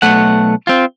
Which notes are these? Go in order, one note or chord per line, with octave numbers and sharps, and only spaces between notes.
B1 A3 F#5
C4 F4